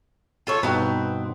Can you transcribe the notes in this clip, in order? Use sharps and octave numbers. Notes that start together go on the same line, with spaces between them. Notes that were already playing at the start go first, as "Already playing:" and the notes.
F4 A4 C#5
G2 B2 B3 C4 D#4